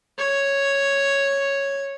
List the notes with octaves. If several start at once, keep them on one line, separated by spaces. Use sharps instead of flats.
C#5